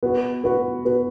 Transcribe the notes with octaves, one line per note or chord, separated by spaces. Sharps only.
B3 F#4 B4
B3 F#4 B4
B3 F#4 B4